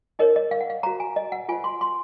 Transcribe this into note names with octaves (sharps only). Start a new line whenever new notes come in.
D#4 A#4 C#5 D#5
D#5
F5
F#5
F5
F#4 C5 A#5
G#5
D#5
F#5
F4 C5 G#5
C6
C6